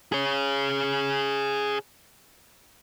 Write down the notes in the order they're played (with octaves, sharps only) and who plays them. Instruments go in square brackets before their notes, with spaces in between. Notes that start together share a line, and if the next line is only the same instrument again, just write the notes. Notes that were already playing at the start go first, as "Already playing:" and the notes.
[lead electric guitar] G#4 C#5